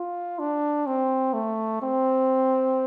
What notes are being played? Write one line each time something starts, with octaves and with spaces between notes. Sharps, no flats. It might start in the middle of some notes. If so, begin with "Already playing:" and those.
Already playing: F4
D4
C4
A3
C4